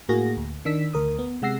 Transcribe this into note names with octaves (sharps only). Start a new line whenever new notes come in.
A2 A#3 F#4 G#4 A#6
D2
D#3 D4 E6 B6
D2 A#4 D#6
B3
C3 G#3 F#5 E6 A#6 C7